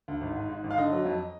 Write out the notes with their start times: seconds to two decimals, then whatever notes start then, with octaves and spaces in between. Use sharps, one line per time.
0.08 D2
0.21 G#1
0.36 G#2
0.49 G#2
0.64 G#1
0.71 F5
0.77 D3 D#5
0.92 F#3
1.05 F2